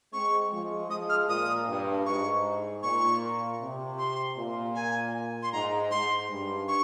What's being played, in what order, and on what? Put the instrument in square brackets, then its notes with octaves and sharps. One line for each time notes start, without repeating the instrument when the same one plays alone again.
[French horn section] G#3 C4 [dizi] C#6
[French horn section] F3 G#3
[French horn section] F3 G#3 [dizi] D#6
[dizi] F6
[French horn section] A#2 [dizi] D#6
[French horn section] G2
[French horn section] G#2 [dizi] C#6
[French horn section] A#2 [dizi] C#6
[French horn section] C3
[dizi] C6
[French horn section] A#2
[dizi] G#5
C6
[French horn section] G#2 [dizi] A#5
[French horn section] G#2 [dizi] C6
[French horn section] G2
[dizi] C#6